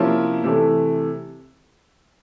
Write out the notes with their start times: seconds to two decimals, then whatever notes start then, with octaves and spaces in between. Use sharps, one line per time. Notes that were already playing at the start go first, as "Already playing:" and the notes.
Already playing: C3 F3 A#3 C#4 E4
0.44 C3 E3 A3